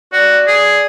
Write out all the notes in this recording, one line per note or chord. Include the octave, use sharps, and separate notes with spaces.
F#4 D5
G#4